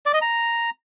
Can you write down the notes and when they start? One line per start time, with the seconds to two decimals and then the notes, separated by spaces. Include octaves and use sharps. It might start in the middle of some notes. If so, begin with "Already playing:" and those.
0.06 D5
0.14 D#5
0.21 A#5